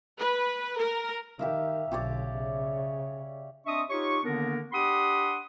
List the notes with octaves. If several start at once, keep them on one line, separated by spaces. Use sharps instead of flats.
B4
A#4
D#3 G4 E5 F5
B1 D3 G4 C#5 D5
C#3
C4 D4 D#5 E5 C#6 D#6
D#4 F4 G4 C#5 C#6
D3 D#3 A#3 B3 D4 A#4
D4 G4 F#5 B5 C6 D#6